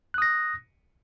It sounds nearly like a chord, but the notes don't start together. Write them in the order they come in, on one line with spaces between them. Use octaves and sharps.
F#6 D#6 A#6